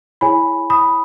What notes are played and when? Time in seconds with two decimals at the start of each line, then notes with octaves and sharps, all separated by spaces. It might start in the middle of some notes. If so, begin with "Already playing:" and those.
0.21 E4 G#4 C#5 G#5 B5
0.70 B5 D#6